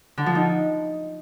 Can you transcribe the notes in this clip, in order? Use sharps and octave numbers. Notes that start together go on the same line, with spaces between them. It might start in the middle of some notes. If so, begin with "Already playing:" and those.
D3
F3
D#4